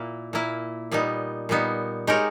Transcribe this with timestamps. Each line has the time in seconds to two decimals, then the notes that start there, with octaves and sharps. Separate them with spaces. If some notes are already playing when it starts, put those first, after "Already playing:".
Already playing: A#2 A#3 E4
0.33 A#2 A#3 E4
0.91 A#2 G3 B3 D#4
1.49 A#2 G3 B3 D#4
2.07 G#3 D#4 G4 A#4 C#5